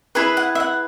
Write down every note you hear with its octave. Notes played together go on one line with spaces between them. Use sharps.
E4 G#4 B4 B5
F#5
E5
F#5